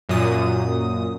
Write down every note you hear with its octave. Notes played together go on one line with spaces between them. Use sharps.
F#2 A#2 D#6